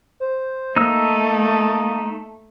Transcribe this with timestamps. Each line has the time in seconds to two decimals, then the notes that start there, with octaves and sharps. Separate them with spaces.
0.20 C5
0.76 A3 A#3 D#4 E6